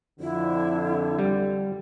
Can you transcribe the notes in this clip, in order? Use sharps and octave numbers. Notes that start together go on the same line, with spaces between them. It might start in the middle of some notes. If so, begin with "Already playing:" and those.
F2 D3 E4
G3